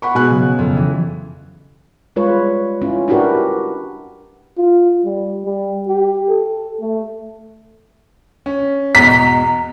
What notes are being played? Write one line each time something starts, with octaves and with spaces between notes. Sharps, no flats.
F#5 B5 C#6
B2 G#3 G#5 F#6
C#3 F#3
F2
E3
G3 G#3 F4 B4 C#5
C#4 E4 F4
D4 E4 F#4 G4 A#4 B4
F4
G3
G3
G4
A4
A3
C#4
E2 G#2 B2 A#5 B6
A#5